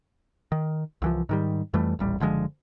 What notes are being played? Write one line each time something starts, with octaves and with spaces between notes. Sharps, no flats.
D#3
C2 E3 F3
G#2 D#3 G3
F2 E3 G3 A3
D#1 A1 G3
F#1 D3 F3 G#3